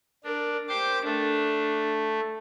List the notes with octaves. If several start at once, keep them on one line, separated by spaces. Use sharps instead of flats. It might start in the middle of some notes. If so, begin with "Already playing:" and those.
D4 A#4
G4 C5 C6 D6
A3 D4